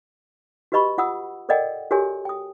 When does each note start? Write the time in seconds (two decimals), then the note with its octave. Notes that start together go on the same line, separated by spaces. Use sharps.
0.72 F#4 G4 B4 D#5 B5 C#6
0.98 F4 F#5 D#6 E6
1.49 A4 A#4 D5 D#5 F#5 G5
1.91 F#4 G4 A4 A#4 C#5 G#5
2.25 G5 D#6